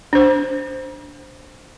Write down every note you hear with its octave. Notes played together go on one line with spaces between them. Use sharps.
D4 C5